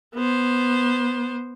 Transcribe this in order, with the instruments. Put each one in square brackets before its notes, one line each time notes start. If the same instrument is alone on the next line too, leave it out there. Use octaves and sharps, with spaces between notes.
[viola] B3 C5